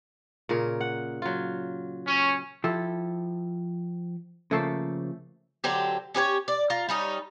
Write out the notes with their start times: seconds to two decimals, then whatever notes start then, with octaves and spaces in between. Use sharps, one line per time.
0.49 A#2 C#3 A#4
0.81 F#5
1.22 F#3 F4
2.08 C#4
2.64 F3 E4 G4 A4
4.51 C#3 F3 A3 A#3 A4 C5
5.64 D3 F#3 C4 G4
6.14 C#4 G4 B4 C#5
6.48 D5
6.70 F4 A#5
6.89 G3 C#4 D#4